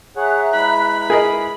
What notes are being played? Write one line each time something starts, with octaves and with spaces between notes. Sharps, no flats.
G#4 C#5 E5 F#5 A#5 F#6
G#3 E4 B4 B5
G#4 A#4 D#5